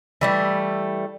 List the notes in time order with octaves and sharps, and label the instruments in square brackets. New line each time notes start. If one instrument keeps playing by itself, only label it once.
[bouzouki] E3 G3 A3